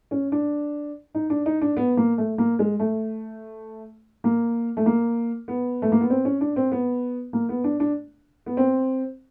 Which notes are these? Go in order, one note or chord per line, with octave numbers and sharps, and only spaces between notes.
C#4
D4
D#4
D4
D#4
D4
B3
A#3
A3
A#3
G#3
A3
A#3
A3
A#3
B3
A3
A#3
B3
C4
C#4
D4
C4
B3
A#3
B3
D4
D4
B3
C4